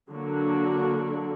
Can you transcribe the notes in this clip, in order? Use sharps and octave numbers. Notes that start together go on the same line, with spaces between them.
D3 F#3 A#3 D4 F#4